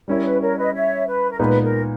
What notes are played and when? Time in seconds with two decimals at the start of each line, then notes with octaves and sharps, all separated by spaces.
0.08 G3 C#4 E4 A#4 C#5
0.25 B4
0.41 A#4 C#5
0.57 B4 D#5
0.74 C#5 E5
1.07 B4
1.31 A#4
1.39 A#2 G#3 B3 D#4 B4
1.62 A#4